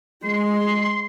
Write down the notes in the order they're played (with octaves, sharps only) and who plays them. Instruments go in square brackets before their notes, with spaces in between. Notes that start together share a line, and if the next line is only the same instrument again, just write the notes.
[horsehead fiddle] G#3 [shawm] C6